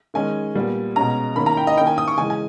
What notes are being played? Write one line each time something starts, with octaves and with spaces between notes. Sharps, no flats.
D#3 G#3 C#4 G#5
A#2 G3 B3
B2 G#3 C#4 A#5
D#3 A#3 C#4 B5
A#5
G5
D#5
D#3 A#3 C#4 G5
G#5
D#6
C#6
C#3 E3 G#3 G#5
G#5